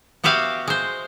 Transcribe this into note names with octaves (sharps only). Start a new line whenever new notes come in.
B3 F#4 G4 E5 F5
G#3 C5